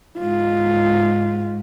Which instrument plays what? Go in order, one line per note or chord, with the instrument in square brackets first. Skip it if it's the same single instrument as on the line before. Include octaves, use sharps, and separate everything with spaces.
[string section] G#2 [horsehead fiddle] F4